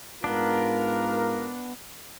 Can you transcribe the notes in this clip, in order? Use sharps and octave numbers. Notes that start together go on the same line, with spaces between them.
G#2 B3 D4 F4 A#4